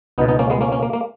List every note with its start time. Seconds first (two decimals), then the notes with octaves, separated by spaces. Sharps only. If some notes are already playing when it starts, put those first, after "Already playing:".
0.18 C#2 B3 D#4
0.21 B2
0.28 B3 D#4
0.39 A#3 C#4
0.50 G#3 B3
0.61 A#3 C#4
0.72 A#3 C#4
0.83 A#3
0.93 A#3